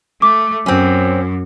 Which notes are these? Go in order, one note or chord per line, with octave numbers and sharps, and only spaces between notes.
A3 D6
F#2 C4 C#4